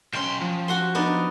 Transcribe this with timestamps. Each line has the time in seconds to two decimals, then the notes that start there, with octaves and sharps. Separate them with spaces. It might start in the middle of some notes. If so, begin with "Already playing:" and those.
0.13 B1 C#4 G5 C6
0.42 F3
0.68 F#4 F#5 C6
0.95 B3 D4 D#4